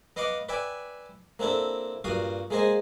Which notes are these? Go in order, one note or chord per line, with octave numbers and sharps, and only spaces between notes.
B3 D#5 F5 F#5 D6
B4 D5 E5 G5 G#5
A#3 C4 D4 E4 A4
G2 A#2 F#4 F5 D#6
G#3 A#3 G#4 C5 D#5 G#5